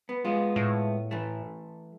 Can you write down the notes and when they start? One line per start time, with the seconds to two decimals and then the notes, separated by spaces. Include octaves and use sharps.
0.09 B3
0.25 G#3 B3 F4
0.56 A2
1.11 E3 A3